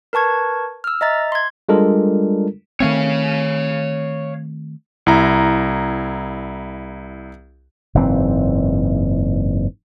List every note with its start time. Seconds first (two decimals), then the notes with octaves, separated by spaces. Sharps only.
0.13 A#4 B4 A5 C#6 G#6
0.84 E6 F6
1.01 D#5 E5 A#5 A6
1.32 C6 G#6
1.69 G3 G#3 D4 F4 A4 A#4
2.80 D#3 A3 C4 C#5 F5
5.06 C2 E4 A#5
7.95 F#1 G#2 E3 C4